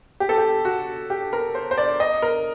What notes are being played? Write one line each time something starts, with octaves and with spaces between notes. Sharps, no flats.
G4
A4
G4
F#4
G4
A#4
C5
C5
D5
D#5
A#4